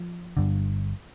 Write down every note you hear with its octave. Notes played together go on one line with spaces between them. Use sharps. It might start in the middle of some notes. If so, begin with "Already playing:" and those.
Already playing: F3
G1 G2 D3